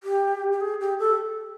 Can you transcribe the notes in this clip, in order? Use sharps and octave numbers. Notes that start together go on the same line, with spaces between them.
G4
G4
G#4
G4
A4